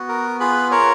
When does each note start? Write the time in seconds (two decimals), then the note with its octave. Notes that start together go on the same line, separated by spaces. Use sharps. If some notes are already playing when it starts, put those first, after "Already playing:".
Already playing: B3 F#4
0.09 A#4
0.40 F4 G#4 B4
0.71 A#4 C#5